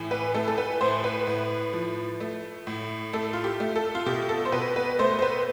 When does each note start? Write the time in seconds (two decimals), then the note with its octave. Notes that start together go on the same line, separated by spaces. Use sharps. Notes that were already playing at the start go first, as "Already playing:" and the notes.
Already playing: A2 E3
0.11 B4
0.34 A3 A4
0.48 A4
0.58 B4
0.81 A2 C5
1.04 B4
1.27 A2
1.73 F3
2.20 A3
2.67 A2
3.13 A3 A4
3.33 F4
3.44 G4
3.60 A3
3.76 A4
3.95 F4
4.06 B2 G4
4.29 A4
4.45 C5
4.52 B2 B4
4.76 B4
4.99 A3 C5
5.19 C5
5.22 B4